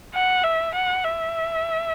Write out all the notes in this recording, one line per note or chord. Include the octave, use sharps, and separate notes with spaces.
F#5
E5
F#5
E5